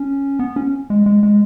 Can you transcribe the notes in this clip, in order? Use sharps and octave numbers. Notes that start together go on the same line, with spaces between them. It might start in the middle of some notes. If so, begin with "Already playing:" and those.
Already playing: C#4
B3
C#4
G#3
G#3
G#3